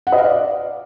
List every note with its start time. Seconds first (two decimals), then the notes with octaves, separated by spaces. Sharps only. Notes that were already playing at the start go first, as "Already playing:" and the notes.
0.07 F#5
0.12 D#5
0.18 F5
0.24 D5